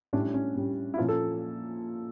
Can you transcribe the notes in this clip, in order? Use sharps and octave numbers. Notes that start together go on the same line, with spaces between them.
A2 G3 C#4 D4
C#4
A2 G3 C#4
E4
A#2 F3 A#3 C#4 F4
A4